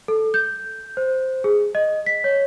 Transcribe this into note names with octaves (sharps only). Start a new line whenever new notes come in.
A4
G6
C5
G#4
D#5
B6
C#5